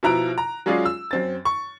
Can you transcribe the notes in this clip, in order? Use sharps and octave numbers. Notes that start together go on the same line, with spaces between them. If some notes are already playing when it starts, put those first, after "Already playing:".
B2 F3 E4 A#5 F#6 D7
A#5
F#3 G#3 C#4 F4 G#4 D5
E6
F#2 C4 A6
C#6